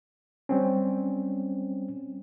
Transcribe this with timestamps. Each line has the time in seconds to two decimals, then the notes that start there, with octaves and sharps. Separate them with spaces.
0.49 G3 C4 C#4